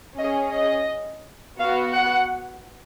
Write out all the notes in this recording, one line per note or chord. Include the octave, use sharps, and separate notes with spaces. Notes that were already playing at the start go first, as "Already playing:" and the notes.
C#4 G#4 D#5
D#5
B3 F#4 F5
F#5